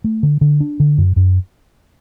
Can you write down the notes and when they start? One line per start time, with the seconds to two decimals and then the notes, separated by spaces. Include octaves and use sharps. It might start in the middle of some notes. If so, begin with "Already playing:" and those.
0.04 A3
0.23 D3
0.41 D3
0.60 D4
0.80 D3
0.98 F#2
1.16 F#2